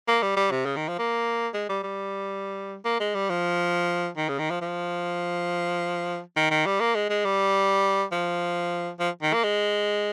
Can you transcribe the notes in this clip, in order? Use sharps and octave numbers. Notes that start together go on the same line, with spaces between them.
A#3
G3
G3
C3
C#3
D#3
F3
A#3
G#3
G3
G3
A#3
G#3
G3
F3
D#3
C#3
D#3
F3
F3
D#3
D#3
G3
A#3
G#3
G#3
G3
F3
F3
D#3
A#3
G#3